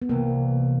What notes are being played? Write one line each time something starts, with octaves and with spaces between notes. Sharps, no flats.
B3
C2 C3 E3 A#3